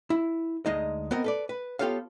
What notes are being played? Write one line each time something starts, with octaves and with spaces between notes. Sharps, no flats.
E4
D2 G#3 D#4 D#5
B3 C4 A#4 D#5
A4 B4 D5
B4
B3 F4 G4 A4 C#5 F5